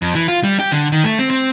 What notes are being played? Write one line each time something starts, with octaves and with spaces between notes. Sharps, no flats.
F2
E3
F4
G3
G4
D3
D#3
A3
C4
C4